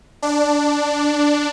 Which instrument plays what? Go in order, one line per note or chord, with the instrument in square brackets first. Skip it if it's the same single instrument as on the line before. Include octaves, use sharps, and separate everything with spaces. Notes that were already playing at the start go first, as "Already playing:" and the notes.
[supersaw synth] D4